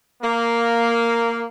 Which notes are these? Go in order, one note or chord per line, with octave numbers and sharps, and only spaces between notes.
A#3